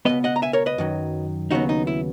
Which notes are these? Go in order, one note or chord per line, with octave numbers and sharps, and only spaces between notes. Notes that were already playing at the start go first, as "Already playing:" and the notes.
C#2 B2 G#3 B3 B4 D#5
D#5 F#5
A#5
E5 G#5
A#4 C#5
B4 D#5
F#2 D#3 F#3
D#2 C#3 F#3 B3 D#4 F#4
D#4
E4